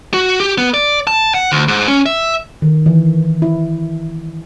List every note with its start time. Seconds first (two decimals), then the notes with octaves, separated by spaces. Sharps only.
0.14 F#4
0.40 G4
0.58 B3
0.74 D5
1.07 A5
1.34 F#5
1.52 D2
1.68 G#2
1.88 C#4
2.06 E5
2.62 D#3
2.86 E3
3.42 E4